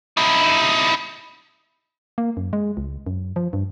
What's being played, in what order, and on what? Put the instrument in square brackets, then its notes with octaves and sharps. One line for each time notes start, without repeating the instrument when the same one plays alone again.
[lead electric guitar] D#4 E4
[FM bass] A#3
F#2
G#3
C#2
F#2
F3
G2